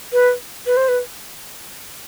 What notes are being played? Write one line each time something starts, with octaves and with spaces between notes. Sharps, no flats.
B4
B4
C5
B4